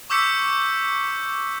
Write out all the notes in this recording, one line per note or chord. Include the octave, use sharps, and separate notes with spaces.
C#6 D6 E6 G6 B6 C#7